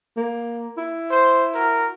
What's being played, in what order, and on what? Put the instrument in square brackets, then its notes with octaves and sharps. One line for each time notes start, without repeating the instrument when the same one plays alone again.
[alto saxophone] A#3
E4
[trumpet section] C5
F#4 A#4